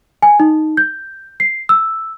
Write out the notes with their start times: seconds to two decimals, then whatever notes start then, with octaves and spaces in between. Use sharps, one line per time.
0.22 G#5
0.40 D#4
0.77 G6
1.40 C7
1.69 E6